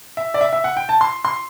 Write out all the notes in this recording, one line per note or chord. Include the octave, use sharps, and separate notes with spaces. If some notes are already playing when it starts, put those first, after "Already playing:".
E5
D5
E5
E5
F#5
G5
A5
C6
C6